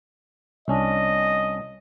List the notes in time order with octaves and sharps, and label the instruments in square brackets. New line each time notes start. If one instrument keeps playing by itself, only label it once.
[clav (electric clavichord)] C2 C#4 D4 [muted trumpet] D#5